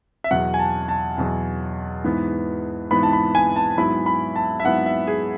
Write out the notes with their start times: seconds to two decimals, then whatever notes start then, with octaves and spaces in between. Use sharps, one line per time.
0.24 E5
0.31 E2 B2 F#3 F#5
0.54 G#5
0.59 A5
0.88 A5
1.17 E2 B2 F#3
2.04 G#2 E3 B3
2.91 G#2 E3 B3 B5
3.03 A5
3.13 B5
3.35 G#5
3.56 A5
3.78 G#2 F#3 B3 E4 B5
4.06 B5
4.36 A5
4.60 E5
4.64 G#2 F#3 B3 E4 F#5
4.86 E5
5.08 G#4